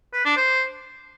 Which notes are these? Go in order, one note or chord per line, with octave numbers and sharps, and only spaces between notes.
B4
D4
C5